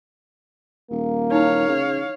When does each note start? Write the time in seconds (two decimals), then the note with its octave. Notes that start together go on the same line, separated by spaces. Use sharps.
0.91 D#1 A#3
1.32 D#4 E4 C#5 F5
1.68 C#3